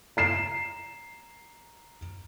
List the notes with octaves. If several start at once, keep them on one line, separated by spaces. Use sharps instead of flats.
A#5 C7 E7